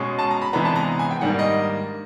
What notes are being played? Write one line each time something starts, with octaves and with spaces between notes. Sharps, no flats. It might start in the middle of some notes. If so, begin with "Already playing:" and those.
Already playing: B2 G#3 C#4
A5
A#5
B5
C3 E3 G#3 B3 D4 A#5
A5
A#5
G#5
G5
G#2 D#3 G3 A#3 D4 F#5
D#5